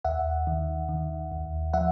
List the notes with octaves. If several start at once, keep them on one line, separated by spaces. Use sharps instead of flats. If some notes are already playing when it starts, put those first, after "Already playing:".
D#2 E5 F#5
D#3
D#3
D#2
F3 E5 F#5